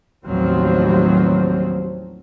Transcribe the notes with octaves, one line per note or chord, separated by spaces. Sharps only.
A1 D#2 F3 F#3 C4